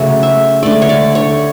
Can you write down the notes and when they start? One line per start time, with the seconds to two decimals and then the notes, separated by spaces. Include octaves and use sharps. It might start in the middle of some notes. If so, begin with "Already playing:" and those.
Already playing: C#3 F#3 A3 C#5
0.23 E5
0.63 D3 A3 D5
0.82 C#5
0.89 D5
1.15 C#5